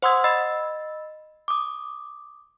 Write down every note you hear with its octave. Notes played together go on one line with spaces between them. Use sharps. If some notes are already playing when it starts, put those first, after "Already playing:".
C5 F#5 C6 D#6 E6 G#6
D#5 B5 E6 A6 C7
D6 D#6